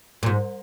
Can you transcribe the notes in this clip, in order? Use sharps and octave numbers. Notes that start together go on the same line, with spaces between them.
A#2
G#2